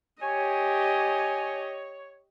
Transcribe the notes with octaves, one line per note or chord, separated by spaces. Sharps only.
G4 C#5 D#5 G#5